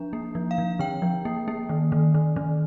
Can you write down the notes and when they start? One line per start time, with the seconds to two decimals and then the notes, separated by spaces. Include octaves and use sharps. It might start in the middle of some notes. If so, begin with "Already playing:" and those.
Already playing: F3 D4
0.13 A#3
0.35 F3
0.51 F5
0.58 F3
0.79 D3 G5
1.02 F3
1.25 A#3
1.48 A#3
1.69 D#3
1.92 D#3
2.15 D#3
2.36 D#3